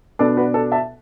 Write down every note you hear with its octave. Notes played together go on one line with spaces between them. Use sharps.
B2 B3 D4 A4 D5
F#4 B4
A4
E5 A5